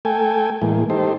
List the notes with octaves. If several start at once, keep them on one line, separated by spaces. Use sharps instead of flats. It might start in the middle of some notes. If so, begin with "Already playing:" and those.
A3 A4 G5 G#5
A2 E3 G#3 A#3
D#4 G4 A4 C5